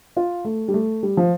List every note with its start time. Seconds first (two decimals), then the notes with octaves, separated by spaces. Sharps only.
0.17 F4
0.45 A3
0.68 G3
0.74 A3
1.03 G3
1.17 F3